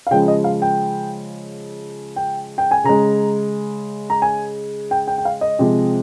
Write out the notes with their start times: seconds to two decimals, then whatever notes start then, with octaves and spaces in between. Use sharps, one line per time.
0.07 F5
0.11 C#3 F3 G#3 G5
0.28 D#5
0.44 F5
0.62 G5
2.16 G5
2.58 G5
2.71 G#5
2.84 C#3 G#3 A#5
4.10 A#5
4.22 G#5
4.91 G5
5.07 G5
5.18 G5
5.25 F5
5.41 D#5
5.59 C3 F3 G#3